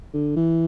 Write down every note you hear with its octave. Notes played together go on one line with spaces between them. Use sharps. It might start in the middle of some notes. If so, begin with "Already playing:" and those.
D3
E3